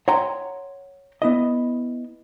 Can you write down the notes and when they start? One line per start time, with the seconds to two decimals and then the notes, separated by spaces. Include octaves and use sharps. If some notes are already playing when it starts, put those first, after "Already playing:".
0.08 C#5 F#5 G5 A#5 C6
1.22 B3 E4 D#5